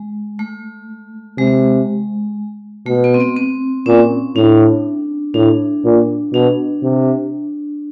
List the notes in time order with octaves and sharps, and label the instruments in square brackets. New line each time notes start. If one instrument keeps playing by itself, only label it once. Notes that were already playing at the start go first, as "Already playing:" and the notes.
Already playing: [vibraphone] G#3
A3
[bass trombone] C3 [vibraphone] G#3
[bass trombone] B2 [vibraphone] A3
[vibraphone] B3
C4
B3
C4
[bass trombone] A#2 [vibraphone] C#4
[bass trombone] A2 [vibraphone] D4
[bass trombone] A2 [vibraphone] D4
[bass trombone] A#2
[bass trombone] B2 [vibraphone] D4
[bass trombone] C3